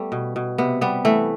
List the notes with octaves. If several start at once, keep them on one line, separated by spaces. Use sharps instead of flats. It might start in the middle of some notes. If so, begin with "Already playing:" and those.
Already playing: G3 A3 B3
B2
B2
C3 B3
G3 B3
E3 A3